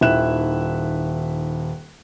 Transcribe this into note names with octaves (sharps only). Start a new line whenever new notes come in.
D#1 D#3 E4 E5 F#6 E7